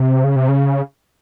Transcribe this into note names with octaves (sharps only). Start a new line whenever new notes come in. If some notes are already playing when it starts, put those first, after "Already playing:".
Already playing: C3
C#3
C3
C#3